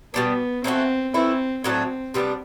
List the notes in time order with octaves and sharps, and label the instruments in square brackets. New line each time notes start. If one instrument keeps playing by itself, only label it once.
[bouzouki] B2 G3 D4 [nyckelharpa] B3
[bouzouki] E3 A3 D4 F#4 [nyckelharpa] C4
[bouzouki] E3 A3 E4 [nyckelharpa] C4
[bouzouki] A2 F#3 A3 D4 [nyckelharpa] C4
[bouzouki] C3 G3 B3 D4